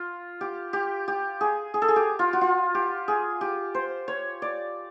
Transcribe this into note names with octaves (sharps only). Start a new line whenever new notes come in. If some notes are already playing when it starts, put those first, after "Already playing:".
Already playing: F4
G4
G4
G4
G#4
G#4
A4
G#4
G4
F4
F#4
F4
G4
G#4
G4
C5
C#5
D5